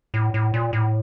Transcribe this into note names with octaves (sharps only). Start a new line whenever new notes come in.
A2
A2
A#2
A2